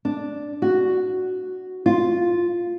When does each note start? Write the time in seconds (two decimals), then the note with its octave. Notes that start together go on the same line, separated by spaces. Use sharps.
0.05 D4
0.62 F#4
1.86 F4